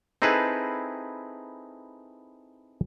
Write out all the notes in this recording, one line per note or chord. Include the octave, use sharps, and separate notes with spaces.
C4 D#4 E4 G#4 A4 B4